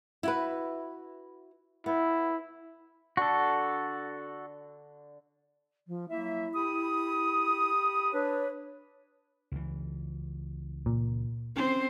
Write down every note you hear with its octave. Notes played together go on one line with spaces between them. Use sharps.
E4 F#4 B4
B3 E4
D3 F#4 A4
F3
F#3 A#3 E4 E5
G4 B5 D#6
D4 B4 C#5
C#2 E3
A#2
C4 C#4 C5